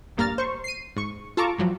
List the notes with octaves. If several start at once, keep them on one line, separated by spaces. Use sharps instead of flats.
A#1 G2 A#3 A#5 F6 A6
C5 C#6
C7 D#7
G#2 C#6
F4 A4 A5 A#5 C#6 D6
G2 F3 F#3